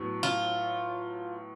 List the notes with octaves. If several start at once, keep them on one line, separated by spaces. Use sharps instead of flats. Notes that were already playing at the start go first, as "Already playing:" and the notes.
Already playing: A2 F#3 B3
F4